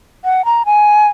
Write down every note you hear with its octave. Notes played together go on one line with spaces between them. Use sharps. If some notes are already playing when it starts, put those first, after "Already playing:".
F#5
A#5
G#5